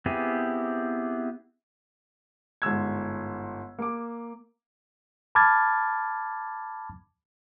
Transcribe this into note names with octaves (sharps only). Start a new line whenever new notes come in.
B3 C4 E4 G4 G#4
G1 G#2 E6 G#6
A#3 D6
A5 B5 D6 F6 G#6 A6